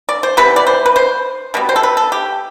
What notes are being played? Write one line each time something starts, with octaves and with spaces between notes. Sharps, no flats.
D5
C5
C3 E3 G3 B3 B4
D5
C5
B4
C5
B2 G3 B3
C5
A4
B4
A4
G4